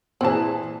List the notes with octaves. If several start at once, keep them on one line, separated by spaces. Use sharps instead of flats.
A#2 E3 C4 G#4 G5 A5